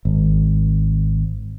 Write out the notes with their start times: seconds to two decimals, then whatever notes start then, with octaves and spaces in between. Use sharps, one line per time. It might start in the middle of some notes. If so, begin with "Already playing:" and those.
0.05 G#1